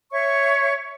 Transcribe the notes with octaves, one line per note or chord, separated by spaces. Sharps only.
C#5 E5 C#6